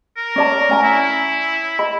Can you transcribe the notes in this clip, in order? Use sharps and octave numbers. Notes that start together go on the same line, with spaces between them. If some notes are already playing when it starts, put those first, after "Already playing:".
A#4
C#4 D5 A5
C#4 G#5 A#5
E4
D#5 B5